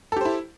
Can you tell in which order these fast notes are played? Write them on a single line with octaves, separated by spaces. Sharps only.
A4 G4 C5 E4